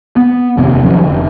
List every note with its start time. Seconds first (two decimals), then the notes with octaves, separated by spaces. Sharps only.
0.17 B3
0.57 F1 D#2 C3
0.85 D3 F3 F#3 C#4
1.06 F1